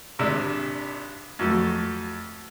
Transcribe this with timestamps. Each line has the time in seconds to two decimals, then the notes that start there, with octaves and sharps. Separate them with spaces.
0.19 G#1 C3 D4
1.39 F2 F#3 A3